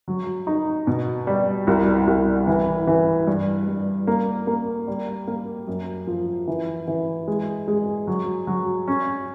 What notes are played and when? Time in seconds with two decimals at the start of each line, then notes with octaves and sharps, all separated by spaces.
0.08 F#3
0.47 D#4
0.87 B2
1.27 G3
1.67 C2
2.07 C2
2.47 E3
2.87 E3
3.27 G2
3.67 G2
4.07 A#3
4.47 A#3
4.88 G3
5.28 A#3
5.67 F#2
6.07 F3
6.47 E3
6.88 E3
7.28 G#3
7.68 G#3
8.07 F#3
8.47 F#3
8.88 C#4